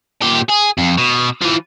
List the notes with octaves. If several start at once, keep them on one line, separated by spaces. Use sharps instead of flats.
A#2 G4
G#4
F2
B2
E3 F3